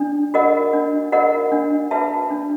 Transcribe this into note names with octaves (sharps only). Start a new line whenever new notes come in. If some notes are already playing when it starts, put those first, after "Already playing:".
Already playing: D4
F#4 A#4 D#5 F#5
D4
F#4 A#4 D#5 F#5
D4
F#4 B4 E5 A5
D4